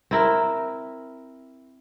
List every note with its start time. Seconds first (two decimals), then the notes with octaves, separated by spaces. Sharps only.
0.11 C4 E4 A#4